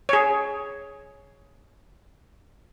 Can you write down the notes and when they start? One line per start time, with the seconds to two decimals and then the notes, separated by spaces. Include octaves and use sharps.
0.09 G#4 C#5